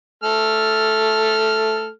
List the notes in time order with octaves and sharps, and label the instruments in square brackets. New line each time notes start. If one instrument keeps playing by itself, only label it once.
[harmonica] A3 A4 F6